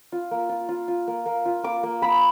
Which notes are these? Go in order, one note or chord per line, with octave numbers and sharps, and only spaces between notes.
F4
A#3
F4
F4
F4
A#3
A#3
F4
A#3 D6
A#3
A#3 B5